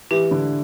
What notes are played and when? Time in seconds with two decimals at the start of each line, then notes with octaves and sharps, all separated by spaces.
0.11 E3 G4
0.31 D3